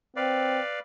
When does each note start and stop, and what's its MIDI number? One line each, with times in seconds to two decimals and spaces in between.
0.16 0.60 60
0.16 0.80 71
0.16 0.80 74
0.16 0.80 77